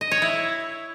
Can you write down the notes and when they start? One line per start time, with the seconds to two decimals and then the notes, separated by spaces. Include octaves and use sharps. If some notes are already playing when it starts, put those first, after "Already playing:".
0.01 D#5
0.11 C#5
0.22 E4